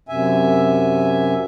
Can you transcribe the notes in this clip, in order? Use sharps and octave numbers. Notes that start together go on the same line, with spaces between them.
F#2 C3 E5 G#5